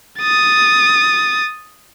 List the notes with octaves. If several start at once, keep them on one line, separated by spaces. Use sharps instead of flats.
D#6 A6